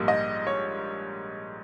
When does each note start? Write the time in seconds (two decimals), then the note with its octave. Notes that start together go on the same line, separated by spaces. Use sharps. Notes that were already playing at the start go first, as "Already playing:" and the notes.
Already playing: A#1 G#2 G3 A#3
0.08 D#5
0.47 C#5